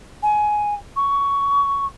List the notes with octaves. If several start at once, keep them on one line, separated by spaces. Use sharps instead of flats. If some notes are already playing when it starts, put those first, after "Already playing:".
G#5
C#6